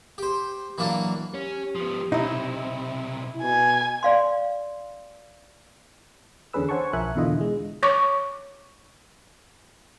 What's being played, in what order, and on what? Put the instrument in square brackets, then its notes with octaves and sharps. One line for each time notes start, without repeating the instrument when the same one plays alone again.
[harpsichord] G4 C5
E3 F#3 A#3 D4
[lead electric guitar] C#4 [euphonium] G4
[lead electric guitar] F3 B3
[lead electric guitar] B1 C3 [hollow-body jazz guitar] D#4 E4
[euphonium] B2 [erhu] G#5
[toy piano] D5 F5 C6
[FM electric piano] E2 D3 C#4 G#4 B4 E6
C5 C#5 F#5 G#5 A5 C#6
B1 F3 A#4 E5 G#5 F#6
E2 B2 D3 E4 F4 D#5
G#3
[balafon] C#5 C#6 D6